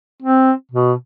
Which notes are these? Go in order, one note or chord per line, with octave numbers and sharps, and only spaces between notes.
C4
B2